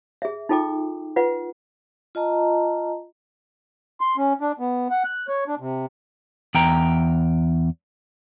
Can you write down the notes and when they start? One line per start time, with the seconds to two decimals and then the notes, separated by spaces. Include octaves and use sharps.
0.22 G#4 E5
0.49 D#4 F4 A4 G5 D6
1.16 F4 B4 F#5
2.15 F4 D#5 A5 A#5
4.01 C6
4.18 C#4
4.41 D4
4.59 B3
4.91 F#5
5.04 F#6
5.28 C#5
5.48 D4
5.59 C3
6.55 E2 G5 A#5